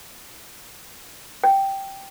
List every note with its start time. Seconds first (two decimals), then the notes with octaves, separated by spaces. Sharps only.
1.44 G5